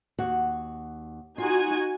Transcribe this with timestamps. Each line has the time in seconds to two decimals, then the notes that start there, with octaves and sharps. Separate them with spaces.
0.19 D#2 F#4 F#5
1.38 D#4 F4 F#4 G#5